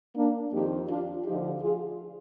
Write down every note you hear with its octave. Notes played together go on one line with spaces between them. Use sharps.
A#3 D4
F2 D#3 D#4 G4
D4 F4
D2 D3 F3 D#4 G4
F4 G#4